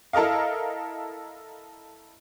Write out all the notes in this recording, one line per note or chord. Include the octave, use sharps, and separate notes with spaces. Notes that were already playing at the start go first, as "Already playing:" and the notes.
E4 A4 A#4 D#5 F5